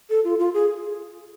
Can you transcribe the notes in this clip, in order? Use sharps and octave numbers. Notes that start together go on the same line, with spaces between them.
A4
F4
F4
G#4